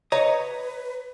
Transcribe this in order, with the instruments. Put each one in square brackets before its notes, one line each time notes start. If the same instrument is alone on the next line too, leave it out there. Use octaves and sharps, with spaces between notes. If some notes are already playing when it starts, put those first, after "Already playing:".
[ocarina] B4 [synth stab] C#5 [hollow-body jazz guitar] D#5 A#5